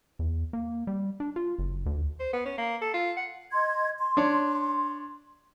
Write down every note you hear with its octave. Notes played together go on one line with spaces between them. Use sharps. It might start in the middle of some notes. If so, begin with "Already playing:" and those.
E2
A#3
G3
D4
F4
F#1
D2
C5
B3
C#4
A#3
A4
F4
F#5
D#5 C6 G#6
C6
D4 C#5